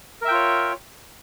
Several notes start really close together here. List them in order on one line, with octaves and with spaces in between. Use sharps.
A#4 E5 G5 F4 C#5